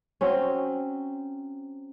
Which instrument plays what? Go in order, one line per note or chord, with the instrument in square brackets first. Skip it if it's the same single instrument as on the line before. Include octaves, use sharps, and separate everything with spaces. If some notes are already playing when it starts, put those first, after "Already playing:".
[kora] F#3 C4 C#4